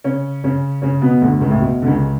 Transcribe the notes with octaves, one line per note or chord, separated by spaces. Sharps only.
C#3 C#4
C#3 C#4
C#3 C#4
B2 B3
D2 D3
C#2 C#3
A2
B2
D3
C#2 C#3